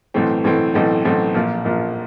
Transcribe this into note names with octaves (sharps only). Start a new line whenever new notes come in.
B1 A2 E3 A3 C4
B1 A2 E3 A3 C4
B1 A2 E3 A3 C4
B1 A2 E3 A3 C4
A#1 A#2 F3
A#1 A#2 F3